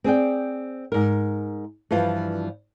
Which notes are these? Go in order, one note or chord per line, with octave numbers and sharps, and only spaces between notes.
C4 G#4 D5 G5
G#2 A#4
G2 E3 F3 F4